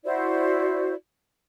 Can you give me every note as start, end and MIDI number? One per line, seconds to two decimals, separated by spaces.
0.05 0.93 64
0.05 0.93 66
0.05 0.93 72
0.05 0.93 74